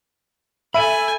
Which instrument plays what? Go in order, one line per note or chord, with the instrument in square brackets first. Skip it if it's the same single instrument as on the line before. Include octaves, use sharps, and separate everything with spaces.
[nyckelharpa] A4 G#5 [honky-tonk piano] E5 D#7 [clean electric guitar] B5